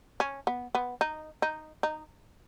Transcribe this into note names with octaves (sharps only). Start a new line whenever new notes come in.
C#4
B3
B3
D#4
D#4
D#4